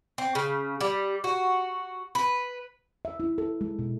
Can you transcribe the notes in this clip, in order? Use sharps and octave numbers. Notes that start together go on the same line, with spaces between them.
C4
C#3
G3
F#4
B4
E5
E4
A4
G#3
B2